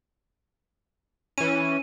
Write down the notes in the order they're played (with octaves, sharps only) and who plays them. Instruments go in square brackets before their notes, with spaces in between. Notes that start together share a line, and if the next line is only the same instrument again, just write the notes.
[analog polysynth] E3 C#4 [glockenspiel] D#7